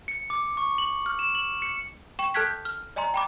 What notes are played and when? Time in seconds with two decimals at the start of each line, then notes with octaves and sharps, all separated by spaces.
0.08 C#7
0.30 D6
0.57 C#6
0.78 F#7
1.06 F6
1.19 E7
1.35 F#7
1.62 C#7
2.19 G5 C#6 E7
2.34 A4 A5 F6 F#6 G#6 B6
2.47 G6
2.65 F6
2.96 D5 D#5 G#5 A#5 C6
3.14 G5 B5 D6